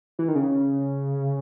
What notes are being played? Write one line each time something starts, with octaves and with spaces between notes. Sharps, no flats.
E3
D#3
C#3